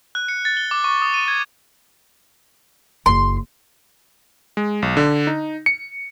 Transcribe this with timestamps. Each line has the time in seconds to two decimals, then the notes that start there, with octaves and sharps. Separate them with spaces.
0.15 F#6
0.28 C#7
0.45 A6
0.57 G7
0.71 D6
0.84 C#6
1.02 D#6
1.14 D#7
1.28 G#6
3.06 F#1 E4 C6
4.57 G#3
4.82 B1
4.97 D3
5.27 D#4
5.66 C#7